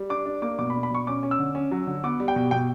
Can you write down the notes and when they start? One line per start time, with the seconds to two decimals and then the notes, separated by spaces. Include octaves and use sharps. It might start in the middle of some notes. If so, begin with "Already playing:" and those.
Already playing: G3
0.10 D4 D6
0.26 D4
0.42 A#3 D6
0.59 B2 D6
0.70 B5
0.75 D4
0.83 B5
0.91 B2 C#6
1.07 C#4 D6
1.23 C#4
1.31 E6
1.39 D3
1.55 C#4
1.71 F#3
1.87 D3
2.04 B3 D6
2.20 G3
2.28 G5
2.36 B2
2.51 B2 G5